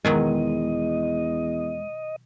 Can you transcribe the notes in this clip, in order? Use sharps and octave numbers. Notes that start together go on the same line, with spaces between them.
E2 B2 D#3 F#3 G#3 D#5